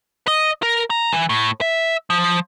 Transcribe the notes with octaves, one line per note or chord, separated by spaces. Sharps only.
D#5
A#4
A#5
E3
A2
E5
F3